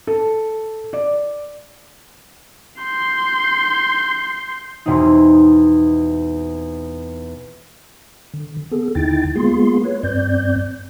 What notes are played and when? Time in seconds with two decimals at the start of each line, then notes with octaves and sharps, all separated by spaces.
0.07 A4
0.93 D5
2.80 C6 G6
4.86 E2 B2 C4 D#4
8.34 D3
8.71 B3 G#4 A4
8.95 D#2 D3 D#4 E4 G5 A6
9.36 G#3 A#3 B3 F4 G#4 C6
9.84 B4 C#5
10.03 G2 C4 D5 G6